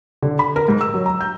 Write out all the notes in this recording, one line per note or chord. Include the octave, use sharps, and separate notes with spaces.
D3
B5
A#4
G#2
E6
F#3
A#5
G6